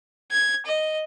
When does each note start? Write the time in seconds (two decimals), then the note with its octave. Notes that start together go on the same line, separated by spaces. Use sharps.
0.32 G#6
0.66 D#5